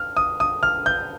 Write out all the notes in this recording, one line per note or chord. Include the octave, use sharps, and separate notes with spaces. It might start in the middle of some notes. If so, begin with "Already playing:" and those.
Already playing: F6
D#6
D#6
F6
G6